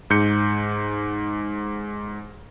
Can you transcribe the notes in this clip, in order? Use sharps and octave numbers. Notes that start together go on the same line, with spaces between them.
G#2 G6 C#7